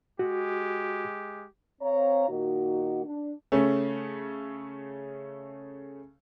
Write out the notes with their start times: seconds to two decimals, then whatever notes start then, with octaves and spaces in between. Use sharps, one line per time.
0.19 G#3 F#4 G4
1.82 C4 C#5 F5 A#5
2.28 A#2 D#3 A#3 D#4 F#4
3.05 D4
3.52 C#3 A3 C#4